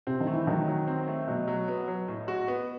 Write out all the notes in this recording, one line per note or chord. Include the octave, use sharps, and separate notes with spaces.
C3 C4
D#3
A3
E3
D#3 F#3
F#3
C4
A3
B2 F#3
F#3
B3
F#3
A2
F#4
B3